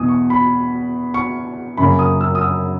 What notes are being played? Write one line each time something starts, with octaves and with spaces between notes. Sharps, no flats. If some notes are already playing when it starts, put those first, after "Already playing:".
Already playing: E2 B2 D#6
C#6
B5
C#6
F#2 C#3 F#3 A#3 B5
D#6
E6
D#6
E6